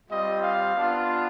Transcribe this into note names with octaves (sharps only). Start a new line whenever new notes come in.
G3 C4 F4 D#5
F5
B3 D4 F4